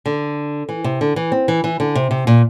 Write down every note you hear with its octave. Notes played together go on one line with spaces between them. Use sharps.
D3
E3
C3
D3
E3
C4
E3
E3
D3
C3
C3
A#2